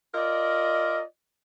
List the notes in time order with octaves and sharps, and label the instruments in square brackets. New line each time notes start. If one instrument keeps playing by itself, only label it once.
[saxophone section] F4 A#4 D5 D#5